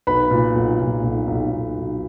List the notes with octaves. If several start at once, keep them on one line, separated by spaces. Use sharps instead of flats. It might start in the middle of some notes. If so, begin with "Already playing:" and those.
B1 B4 B5
A#2
B1
A#2
B1
B1
B1
B1